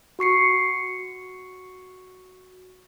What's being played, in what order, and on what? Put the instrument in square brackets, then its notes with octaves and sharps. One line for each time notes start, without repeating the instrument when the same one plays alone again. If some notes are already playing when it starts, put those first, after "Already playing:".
[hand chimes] F#4 C#6 C7 C#7